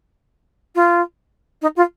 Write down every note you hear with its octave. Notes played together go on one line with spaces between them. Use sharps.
F4
D#4
F4